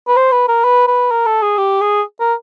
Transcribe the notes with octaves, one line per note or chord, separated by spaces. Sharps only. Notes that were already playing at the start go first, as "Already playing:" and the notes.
B4
C5
B4
A#4
B4
B4
A#4
A4
G#4
G4
G#4
A#4